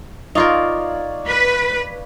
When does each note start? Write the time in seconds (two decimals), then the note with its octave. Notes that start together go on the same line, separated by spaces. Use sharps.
0.35 D#4 F4 A#4 C#5 D5 F5
1.28 B4